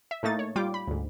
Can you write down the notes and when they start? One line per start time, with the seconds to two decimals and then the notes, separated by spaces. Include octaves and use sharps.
0.11 E5
0.23 A2 A3 A#3 D#4 A6
0.39 C#5
0.56 G3 F4 G5 D6
0.74 B5
0.87 D2 G#2